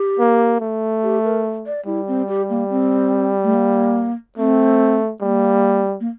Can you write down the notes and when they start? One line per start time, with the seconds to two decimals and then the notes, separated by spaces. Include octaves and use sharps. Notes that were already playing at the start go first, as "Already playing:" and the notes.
Already playing: G4
0.19 A#3
0.60 A3
1.03 G4
1.24 A#4
1.66 D5
1.86 G3 E4
2.08 C4
2.28 G4
2.49 A#3
2.70 C4
3.43 A3
3.54 A#3
4.37 A3 C4
5.21 G3 A#3
6.00 A#3